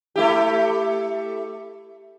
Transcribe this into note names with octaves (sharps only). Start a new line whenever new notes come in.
A3 E4 G4